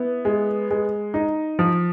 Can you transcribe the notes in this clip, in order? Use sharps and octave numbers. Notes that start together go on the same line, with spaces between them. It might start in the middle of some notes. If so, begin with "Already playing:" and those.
Already playing: B3 E4
G#3
G#3
D#4
F3